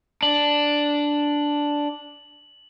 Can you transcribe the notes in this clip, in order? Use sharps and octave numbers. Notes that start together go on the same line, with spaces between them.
D4 F#7